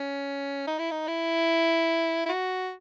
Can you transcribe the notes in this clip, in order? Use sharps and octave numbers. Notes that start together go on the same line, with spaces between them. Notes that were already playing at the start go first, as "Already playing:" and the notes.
Already playing: C#4
D#4
E4
D#4
E4
E4
F#4